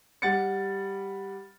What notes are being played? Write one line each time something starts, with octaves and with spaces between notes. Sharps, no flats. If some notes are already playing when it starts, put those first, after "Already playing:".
G3 F#5 A6 C#7